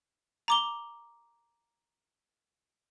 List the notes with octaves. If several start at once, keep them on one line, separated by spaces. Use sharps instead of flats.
A#5 D6 G7